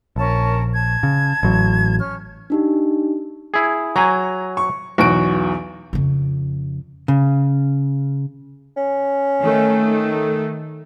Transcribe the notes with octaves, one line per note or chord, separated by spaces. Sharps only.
A#1 C#4 A#4 A5
A5 G#6
C#3
A1 F#3
C#4 F6
D4 D#4 G4
E4 G#4
F#3 G#5 A#5
C#6
B1 E2 F#4 D7
F2 C#3
C#3
C#4
D#3 A3